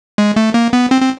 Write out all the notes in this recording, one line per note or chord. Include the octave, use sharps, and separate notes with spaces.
G#3
A3
A#3
B3
C4
C4